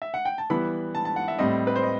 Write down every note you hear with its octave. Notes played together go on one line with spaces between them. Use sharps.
E5
F#5
G5
A5
E3 G3 B3 E4 B5
A5
A5
F#5
E5
A2 G3 C4 D#5
B4
C5
D#5